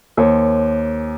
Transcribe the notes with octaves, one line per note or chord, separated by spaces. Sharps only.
D#2 C5 C#5 A5